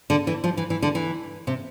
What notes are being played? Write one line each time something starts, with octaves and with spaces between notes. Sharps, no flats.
D3
E3
F3
E3
E3
D3
E3
C3